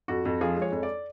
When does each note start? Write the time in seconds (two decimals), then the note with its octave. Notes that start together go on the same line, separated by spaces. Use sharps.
0.08 F2 F#4
0.25 F2
0.41 F3 G#4
0.57 G#3 C#5
0.72 F2
0.83 D5